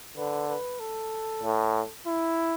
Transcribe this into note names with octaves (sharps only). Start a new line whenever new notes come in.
D3 B4
B4
A4
A2
E4